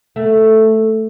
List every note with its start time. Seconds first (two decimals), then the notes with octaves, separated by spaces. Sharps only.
0.16 A3